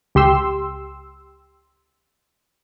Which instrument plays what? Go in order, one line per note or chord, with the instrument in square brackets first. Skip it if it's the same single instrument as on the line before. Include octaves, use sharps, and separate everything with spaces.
[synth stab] C#2 G4 C6 E6